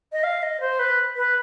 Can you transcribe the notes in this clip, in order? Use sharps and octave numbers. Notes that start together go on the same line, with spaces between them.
D#5
F5
D#5
C5
B4
B4